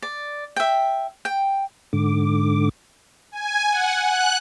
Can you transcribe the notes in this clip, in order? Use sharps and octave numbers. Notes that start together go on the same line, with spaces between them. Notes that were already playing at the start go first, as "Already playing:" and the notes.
D5
E5 G5
G5
G#2 D3 D6
G#5
F#5
F#6